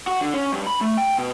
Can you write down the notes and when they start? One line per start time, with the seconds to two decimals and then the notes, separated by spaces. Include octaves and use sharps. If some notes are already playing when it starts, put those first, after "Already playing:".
0.07 F#4
0.21 D3
0.34 C#4
0.52 G2
0.67 B5
0.81 A3
0.97 G5
1.18 B2